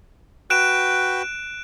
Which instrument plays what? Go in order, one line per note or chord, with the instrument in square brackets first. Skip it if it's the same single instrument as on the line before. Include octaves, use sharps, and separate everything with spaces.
[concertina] F#4 B4 G5 [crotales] F#6 D7 E7